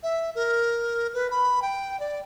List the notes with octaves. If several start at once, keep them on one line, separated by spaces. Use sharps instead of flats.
E5
A#4
B4
B5
G5
D5